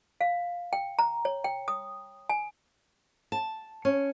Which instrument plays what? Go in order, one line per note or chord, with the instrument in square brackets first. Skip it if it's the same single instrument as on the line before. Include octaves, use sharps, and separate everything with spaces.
[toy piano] F5
G5
A#5
C#5
G5
D#6
G#5
[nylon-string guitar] A5
C#4